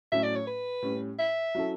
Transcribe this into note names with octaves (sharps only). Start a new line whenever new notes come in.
A2 F#3 A3 C#4 E5
D5
C#5
B4
A2 G3 C#4
E5
F#3 C#4 E4 A4